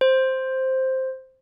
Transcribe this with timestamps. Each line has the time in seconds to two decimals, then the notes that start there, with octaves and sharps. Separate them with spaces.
0.01 C5